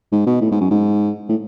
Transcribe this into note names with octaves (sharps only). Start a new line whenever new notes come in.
G#2
B2
A2
G#2
F#2
G#2
A2